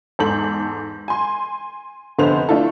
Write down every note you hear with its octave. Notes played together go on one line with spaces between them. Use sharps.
E2 G#2 A4 G6 F#7
G#5 C6
F1 D3 B3 C5 F7
A3 D4 E4 F4 A4